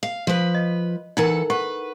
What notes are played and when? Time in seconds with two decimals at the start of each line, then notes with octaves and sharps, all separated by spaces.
0.03 F5
0.27 F3 B4
0.54 D#5
1.17 E3 D#4 E4 A4 A#4 F#5
1.50 B4 F#5 C#6